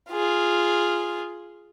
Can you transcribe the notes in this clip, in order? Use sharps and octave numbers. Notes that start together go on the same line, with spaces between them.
F4 G#4